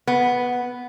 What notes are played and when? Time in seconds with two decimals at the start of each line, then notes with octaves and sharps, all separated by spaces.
0.07 B3